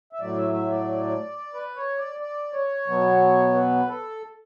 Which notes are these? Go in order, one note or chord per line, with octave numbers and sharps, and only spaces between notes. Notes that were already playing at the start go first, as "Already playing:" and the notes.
E5
A2 F#3 A3 D5
E5
E5
D5
B4
C#5
D5
D5
C#5
B2 F#3 B3
B4
A4